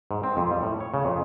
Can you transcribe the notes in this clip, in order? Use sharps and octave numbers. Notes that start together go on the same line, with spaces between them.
G#2
C4
F2
G3
A2
C#5
C#3
F2